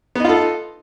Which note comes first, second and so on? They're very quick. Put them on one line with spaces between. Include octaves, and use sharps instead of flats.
B3 D#4 F4 A4